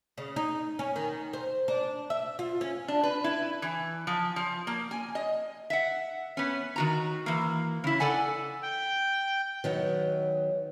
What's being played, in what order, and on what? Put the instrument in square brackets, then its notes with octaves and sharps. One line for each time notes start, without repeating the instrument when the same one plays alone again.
[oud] C#3
D#4
C#4
D#3
C5
D4
E5
F4
C#4
[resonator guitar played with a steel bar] D4
B4
E4
E3
F3
F3
A#3
G#5
D#5
E5 F#5
B3 C#4
D#3 F#4 A#5
E3 A#3
C#3 E4
A4 D5 F#5 G#5
[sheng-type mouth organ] G5
[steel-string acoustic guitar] D#3 F#3 B3